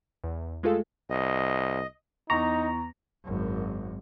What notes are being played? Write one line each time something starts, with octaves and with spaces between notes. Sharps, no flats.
E2
G#3 A3 F4 G#4 A4 F5
C2 D#5
E2 D#4 A#5 C#6
G#1 F#2